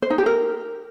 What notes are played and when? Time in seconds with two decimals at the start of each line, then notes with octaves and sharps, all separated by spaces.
0.02 C5
0.10 D#4
0.18 G4
0.26 A#4